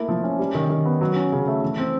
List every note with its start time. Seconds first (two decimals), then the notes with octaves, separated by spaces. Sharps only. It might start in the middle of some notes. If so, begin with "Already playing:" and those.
Already playing: A3 A#3 E4
0.08 F3
0.24 C#4
0.39 G3
0.55 D#3
0.70 D#3
0.86 B3
1.01 F#3
1.16 C#4
1.32 C#3
1.47 A3
1.62 E3
1.78 C4